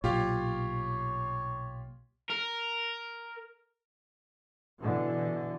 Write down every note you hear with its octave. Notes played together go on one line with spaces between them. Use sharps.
B1 A#2 F4 G4 C#5 F5
A#4
B2 D3 E3